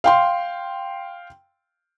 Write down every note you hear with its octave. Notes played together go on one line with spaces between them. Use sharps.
F5 G5 C6